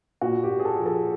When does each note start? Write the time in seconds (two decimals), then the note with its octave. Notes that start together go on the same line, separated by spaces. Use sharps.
0.21 A#2 F#4
0.44 G4
0.50 A#2
0.59 G#4
0.65 A4
0.79 F3
0.86 A4